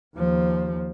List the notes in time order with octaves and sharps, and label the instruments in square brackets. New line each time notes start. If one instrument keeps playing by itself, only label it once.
[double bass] D#2 F3